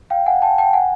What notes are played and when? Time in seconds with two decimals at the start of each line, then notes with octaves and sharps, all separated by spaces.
0.10 F5 G5
0.26 F#5 G#5
0.42 G5 A5
0.58 G5 A5
0.73 F#5 G#5